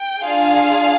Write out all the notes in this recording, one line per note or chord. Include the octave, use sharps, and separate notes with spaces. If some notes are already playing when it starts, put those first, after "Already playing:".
Already playing: G5
D4 F4 G#4 F5